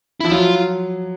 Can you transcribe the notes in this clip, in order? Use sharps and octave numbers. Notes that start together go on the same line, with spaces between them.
F3 E4
F#3 F4